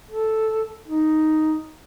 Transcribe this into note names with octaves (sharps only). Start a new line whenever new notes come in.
A4
D#4